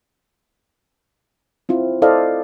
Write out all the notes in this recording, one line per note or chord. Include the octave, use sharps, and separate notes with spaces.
C4 E4 F4
E4 A4 C5 D5 D#5 F5